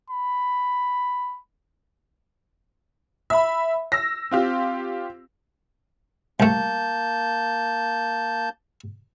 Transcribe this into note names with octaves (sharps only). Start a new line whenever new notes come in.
B5
E5 B5
E6 A#6
C4 F4 G4
C2 A3 A#3 A5 G6